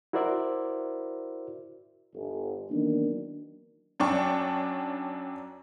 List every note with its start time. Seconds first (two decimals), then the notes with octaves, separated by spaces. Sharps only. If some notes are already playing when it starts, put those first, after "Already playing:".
0.13 E4 F#4 A#4 C5 D5 E5
2.14 G1
2.70 D#3 E3 F#3 A#3 B3 D4
4.00 F#2 D4 G5 C#6